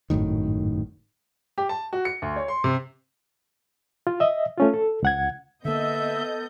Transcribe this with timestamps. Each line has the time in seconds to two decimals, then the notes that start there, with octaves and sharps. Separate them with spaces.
0.10 G#1 F#2 A2 D#3
1.58 G4
1.69 A5
1.93 F#4
2.05 C#7
2.22 D2
2.36 C#5
2.48 C6
2.64 C3
4.07 F4
4.20 D#5 E5
4.58 A3 C#4 F4
4.74 A4
5.03 C#2 F#5 G#6
5.65 D3 A#3 B3 A4 D#5 E5 G6